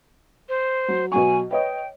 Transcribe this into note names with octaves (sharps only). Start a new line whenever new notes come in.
C5
F#3
B2 F#3 G#5 C#6
B4 C#5 D#5 G5